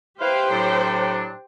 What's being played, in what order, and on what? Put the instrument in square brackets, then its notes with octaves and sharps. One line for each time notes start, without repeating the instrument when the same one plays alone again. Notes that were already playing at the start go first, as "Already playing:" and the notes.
[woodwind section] E4 B4 F5 [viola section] G4 C5 G5
[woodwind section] A2 F#3 D4